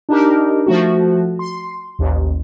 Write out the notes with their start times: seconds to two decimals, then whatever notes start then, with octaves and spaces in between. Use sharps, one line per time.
0.09 D4 D#4 G4 A#4
0.66 F3 A3 F#4
1.39 C6
1.99 A1 D#2